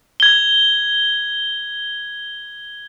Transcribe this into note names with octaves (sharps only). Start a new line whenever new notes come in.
G#6 G7